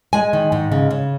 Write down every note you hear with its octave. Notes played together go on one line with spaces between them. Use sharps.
G#3 G#5
D#3
G#2
C#3
C#3